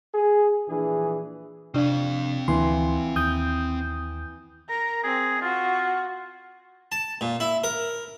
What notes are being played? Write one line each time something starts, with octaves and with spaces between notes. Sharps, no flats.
G#4
A#1 E3 D4 G#4
C3 C4 D4 F5
D2 E3 C6
D#2 D#6 G6
A#4 A#5
C4 G#4
F4 F#4
A5
A#2
E4
A#4